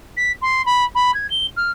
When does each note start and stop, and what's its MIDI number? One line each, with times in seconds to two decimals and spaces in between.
0.17 0.32 95
0.42 0.64 84
0.66 0.84 83
0.95 1.14 83
1.14 1.30 92
1.30 1.47 103
1.57 1.71 89